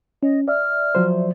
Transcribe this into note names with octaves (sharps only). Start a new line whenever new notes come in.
C#4 D#5
D5 E5 F6
F3 F#3 C5